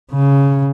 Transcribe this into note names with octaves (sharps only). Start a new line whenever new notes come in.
C#3